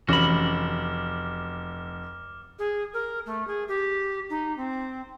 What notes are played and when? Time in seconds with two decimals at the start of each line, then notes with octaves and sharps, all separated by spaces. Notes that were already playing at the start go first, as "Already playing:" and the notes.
0.09 F1 E3 C#4 F#4 B5 D6 F6
2.59 G#4
2.93 A#4
3.26 A3
3.47 G#4
3.68 G4
4.29 D#4
4.57 C4